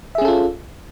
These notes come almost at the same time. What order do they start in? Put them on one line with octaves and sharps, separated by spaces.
E5 G#4 C#4 A4 F4